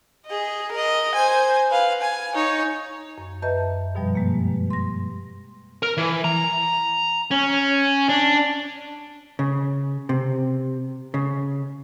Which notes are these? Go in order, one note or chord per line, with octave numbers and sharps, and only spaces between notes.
G#4 D#5
A#4 D#5
C5 G#5
B4 F5
G#5
D#4 C#5
F#2
F#2 B4 D#5 E5 A5 G6
G2 B2 F3 G3
G#3 A#3
C6 A#6
A#4
E3
A#5
C#4
D4
C#3
C3
C#3